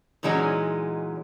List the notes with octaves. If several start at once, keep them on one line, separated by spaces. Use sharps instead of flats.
A#2 E3 F#3 G#3 C#4 D#4